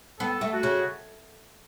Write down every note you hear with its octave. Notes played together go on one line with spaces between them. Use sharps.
B3 A4
A3
F#4
C#3